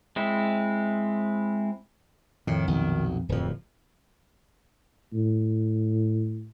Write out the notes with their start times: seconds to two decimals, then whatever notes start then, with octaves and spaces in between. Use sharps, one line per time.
0.16 G#3 C4 E4
2.47 F2 A2 D#3
2.68 B1 A#2 D#3
3.29 D1 F2 F3
5.13 A2